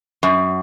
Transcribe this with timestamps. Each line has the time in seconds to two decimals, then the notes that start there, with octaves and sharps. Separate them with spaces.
0.23 F#2